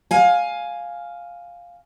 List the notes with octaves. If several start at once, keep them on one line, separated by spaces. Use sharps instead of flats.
F5 G#5